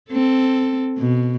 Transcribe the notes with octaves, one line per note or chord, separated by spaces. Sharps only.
C4 A4
B2